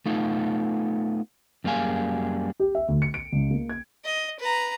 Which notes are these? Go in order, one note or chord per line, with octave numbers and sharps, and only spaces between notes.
A3 B3 D#4 F4
F#2 G3 A#3 G#4 F5 G#5
G4
E5
D2
C#7
D7
C#2
A#3
G#6
D#5
B4 A#5